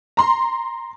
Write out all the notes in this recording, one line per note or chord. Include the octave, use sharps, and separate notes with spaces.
A#5 C6